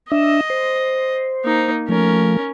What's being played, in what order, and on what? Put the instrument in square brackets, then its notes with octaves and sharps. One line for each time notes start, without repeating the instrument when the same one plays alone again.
[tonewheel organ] D4 E5 [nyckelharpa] D#5
[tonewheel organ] C5
[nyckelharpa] A#3 D#4
[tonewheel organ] F3 A3 [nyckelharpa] C#4 A#4